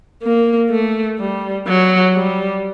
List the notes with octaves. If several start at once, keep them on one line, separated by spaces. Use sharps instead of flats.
A#3
A3
G3
F#3
G3